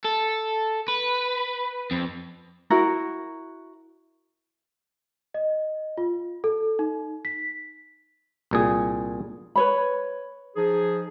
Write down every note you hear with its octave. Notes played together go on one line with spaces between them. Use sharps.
A4
B4
F2
E4 F#4 A#4
D#5
F4
A4
D#4
B6
C2 A#2 G#4
B4 C#5 B5
F3 D#4 G#4